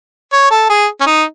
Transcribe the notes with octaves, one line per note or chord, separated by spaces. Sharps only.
C#5
A4
G#4
C#4
D#4